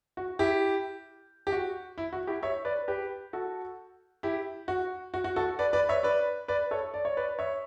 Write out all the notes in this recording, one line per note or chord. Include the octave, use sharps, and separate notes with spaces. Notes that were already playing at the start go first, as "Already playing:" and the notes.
F#4
E4 G4
G4
F#4
E4
F#4
E4 G4
C#5 E5
B4 D5
G4 B4
F#4 A4
E4 G4
F#4
F#4
F#4
F#4 A4
B4 D5
B4 D5
C#5 E5
B4 D5
B4 D5
A4 C#5
D5
C#5
B4 D5
C#5 E5